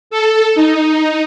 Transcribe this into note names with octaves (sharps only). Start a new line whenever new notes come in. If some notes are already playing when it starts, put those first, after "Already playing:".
A4
D#4